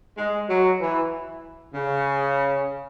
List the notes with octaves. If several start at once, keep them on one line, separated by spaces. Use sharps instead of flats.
G#3
F#3
E3
C#3